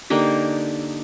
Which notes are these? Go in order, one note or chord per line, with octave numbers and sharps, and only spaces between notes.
D3 A#3 D#4 G4